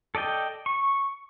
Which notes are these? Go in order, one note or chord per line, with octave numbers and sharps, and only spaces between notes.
A4 D5 D#5 G5
C#6